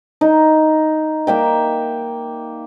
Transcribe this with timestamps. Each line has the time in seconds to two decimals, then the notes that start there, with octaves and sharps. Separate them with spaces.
0.21 D#4
1.27 A#3 E5 G5